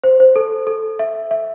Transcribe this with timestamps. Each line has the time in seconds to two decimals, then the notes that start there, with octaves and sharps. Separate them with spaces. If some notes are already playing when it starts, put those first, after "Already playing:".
0.04 C5
0.20 C5
0.36 A4
0.67 A4
0.99 E5
1.31 E5